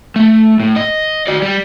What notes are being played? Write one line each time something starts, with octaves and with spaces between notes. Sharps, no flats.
A3
A2
D#5
F#4 D5
G3